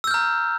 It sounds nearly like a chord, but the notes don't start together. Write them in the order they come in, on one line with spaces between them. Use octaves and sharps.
E6 G6 F6 A#5